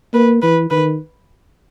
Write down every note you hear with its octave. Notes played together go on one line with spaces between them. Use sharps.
A#3 B4
E3 B4
D#3 B4